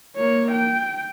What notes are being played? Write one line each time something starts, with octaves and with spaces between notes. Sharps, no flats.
A#3 C#5
G5